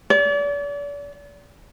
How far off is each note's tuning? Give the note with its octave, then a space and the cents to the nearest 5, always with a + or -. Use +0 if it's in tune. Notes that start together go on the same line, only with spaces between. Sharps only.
D5 -40